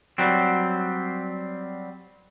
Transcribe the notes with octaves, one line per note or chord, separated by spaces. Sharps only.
F#3 G3 C4